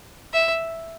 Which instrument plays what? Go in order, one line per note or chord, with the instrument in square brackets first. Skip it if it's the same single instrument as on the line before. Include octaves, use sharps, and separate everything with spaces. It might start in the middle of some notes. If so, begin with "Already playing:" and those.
[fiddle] E5